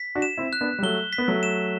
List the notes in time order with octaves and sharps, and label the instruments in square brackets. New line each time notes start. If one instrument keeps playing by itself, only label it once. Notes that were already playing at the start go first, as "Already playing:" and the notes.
Already playing: [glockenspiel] B6
[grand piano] D4 F#4
[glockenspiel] E7
[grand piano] C4 E4
[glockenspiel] F#6
[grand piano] B3 D4
G3
[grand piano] F#3 A3 [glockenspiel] G7
[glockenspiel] B6
[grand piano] B3
F#3 A3
[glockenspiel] E7